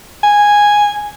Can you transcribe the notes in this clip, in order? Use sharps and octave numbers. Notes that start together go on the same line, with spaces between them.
G#5